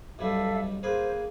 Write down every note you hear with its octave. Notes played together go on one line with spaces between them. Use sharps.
B1 G2 G3 A4 E5 F5
A#3 G#4 B4 C5